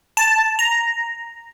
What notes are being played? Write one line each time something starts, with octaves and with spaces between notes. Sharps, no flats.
A5
A#5